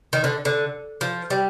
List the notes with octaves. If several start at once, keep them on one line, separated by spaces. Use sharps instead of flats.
D#3
D3
D3
F3
G3